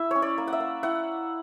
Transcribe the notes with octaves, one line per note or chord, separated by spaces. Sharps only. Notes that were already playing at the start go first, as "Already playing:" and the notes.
Already playing: E4 E5
C#4 C#5
D5
A#3
F#5
E5
A#3
E4 F#5